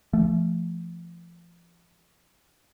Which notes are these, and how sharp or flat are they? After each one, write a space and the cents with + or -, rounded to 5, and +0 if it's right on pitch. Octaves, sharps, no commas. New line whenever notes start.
F3 -30 A3 +0